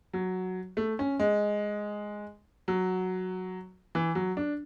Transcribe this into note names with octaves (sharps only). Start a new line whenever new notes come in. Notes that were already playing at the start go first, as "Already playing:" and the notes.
F#3
A3
C#4
G#3
F#3
E3
F#3
D4